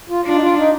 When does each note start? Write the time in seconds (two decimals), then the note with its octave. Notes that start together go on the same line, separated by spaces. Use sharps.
0.09 F4
0.25 D4 F4
0.33 D#4
0.41 F4
0.56 D#4